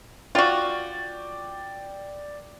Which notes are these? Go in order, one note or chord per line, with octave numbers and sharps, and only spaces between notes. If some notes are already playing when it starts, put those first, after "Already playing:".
F4 F#4 D5 G5 A6